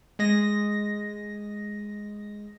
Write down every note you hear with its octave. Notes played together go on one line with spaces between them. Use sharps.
G#3 D#5 A#6